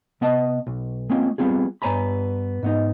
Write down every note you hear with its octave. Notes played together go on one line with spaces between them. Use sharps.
C3 B3 D#5 A5
B1
G#3 A#3 C4 C#4 F4
G3 B3 C4 F4 G#4
G2 B3 C#5 G#5 A#5 B5
G#2 B3 D#4